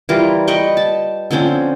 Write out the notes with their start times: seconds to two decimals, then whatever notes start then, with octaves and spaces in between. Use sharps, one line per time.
0.09 E3 G3 F4 A#4
0.48 B4 D#5 G5 C#6
0.77 A5
1.31 D3 F3 C4 C#4